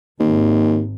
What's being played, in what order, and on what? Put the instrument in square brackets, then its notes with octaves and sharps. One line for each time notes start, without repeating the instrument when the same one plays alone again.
[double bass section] G#1 [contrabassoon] D#2